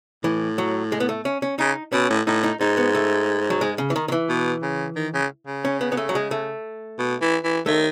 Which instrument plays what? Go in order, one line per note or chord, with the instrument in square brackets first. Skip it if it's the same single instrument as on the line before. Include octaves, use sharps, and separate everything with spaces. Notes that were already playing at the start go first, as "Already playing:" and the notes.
[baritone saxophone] A2 [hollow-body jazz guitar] E3
[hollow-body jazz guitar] F#3
G#3
B3
A3
C#4
C#4
[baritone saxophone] C#3 [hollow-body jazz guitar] D#4
[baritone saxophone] B2 [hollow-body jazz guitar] C#4
[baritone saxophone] A2
[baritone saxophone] A2 [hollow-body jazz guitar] D#4
[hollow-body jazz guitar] D#4
[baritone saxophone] G#2 [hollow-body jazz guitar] D#4
[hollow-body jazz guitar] B3
A3
F#3
G#3
C#3
E3
D#3
D#3
E3
[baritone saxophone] B2
C#3
D#3
C#3
C#3
[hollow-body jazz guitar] C#4
B3
B3
A3
F#3
G#3
A3
[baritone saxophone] B2
E3
E3
[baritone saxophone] D#3 [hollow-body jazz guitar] A3